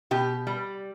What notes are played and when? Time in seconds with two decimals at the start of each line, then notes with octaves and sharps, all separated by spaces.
0.11 B2 G4
0.47 G3